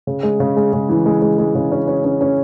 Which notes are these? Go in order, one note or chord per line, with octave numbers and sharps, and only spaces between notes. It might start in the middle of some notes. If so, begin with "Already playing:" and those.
C#3
G#3
C#3
G#3
C#3
E3
G#3
G#3
G#3
C#3
C#4
C#4
C#4
C#4